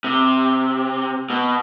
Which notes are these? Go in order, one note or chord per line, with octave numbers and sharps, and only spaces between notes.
C3
B2